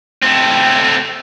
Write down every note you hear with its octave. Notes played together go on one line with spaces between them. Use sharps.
A3 C4